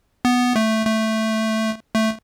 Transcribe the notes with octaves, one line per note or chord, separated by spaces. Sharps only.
B3
A3
A3
A3